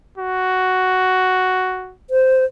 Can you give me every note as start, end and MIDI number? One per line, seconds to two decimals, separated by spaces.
0.18 1.94 66
2.10 2.45 72